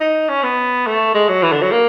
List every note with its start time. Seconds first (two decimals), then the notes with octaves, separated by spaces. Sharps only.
0.01 D#4
0.29 C#4
0.43 B3
0.87 A3
1.15 G#3
1.29 F#3
1.43 E3
1.53 D3
1.62 F#3
1.72 A#3